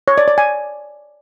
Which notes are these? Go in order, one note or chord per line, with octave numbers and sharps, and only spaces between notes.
C#5
D5
D5
G#5